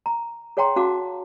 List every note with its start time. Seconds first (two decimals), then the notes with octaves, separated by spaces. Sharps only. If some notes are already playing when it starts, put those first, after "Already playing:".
0.06 A#5
0.57 G#4 C#5 F#5 G5 A#5 C6
0.76 C#4 F#4 F5 F#5 A5 D6